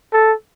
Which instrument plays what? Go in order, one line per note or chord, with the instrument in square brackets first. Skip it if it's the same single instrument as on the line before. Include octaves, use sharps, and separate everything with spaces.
[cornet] A4